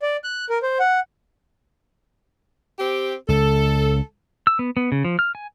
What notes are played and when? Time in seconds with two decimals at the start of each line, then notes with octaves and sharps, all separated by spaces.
0.02 D5
0.24 F#6
0.50 A#4
0.63 C5
0.80 F#5
2.78 C4 G4
3.29 C#2 A4
4.47 E6
4.59 B3
4.77 B3
4.92 C#3
5.04 F3
5.19 F6
5.35 G#5